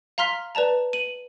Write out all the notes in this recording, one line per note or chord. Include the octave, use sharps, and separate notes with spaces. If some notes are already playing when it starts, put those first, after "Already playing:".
F5 A#5 C6 F6 B6
B4 D5 A5 A#5
D#7 F#7